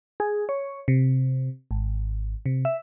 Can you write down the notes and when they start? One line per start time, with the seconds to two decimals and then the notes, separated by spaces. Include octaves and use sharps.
0.20 G#4
0.49 C#5
0.88 C3
1.71 G#1
2.46 C3
2.65 E5